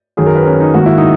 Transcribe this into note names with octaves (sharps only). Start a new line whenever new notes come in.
F#2 D#3 F#3 G#4
A#4
B4
C#4
D#4
G#2 D#3 A#3 F#4
E4
D#4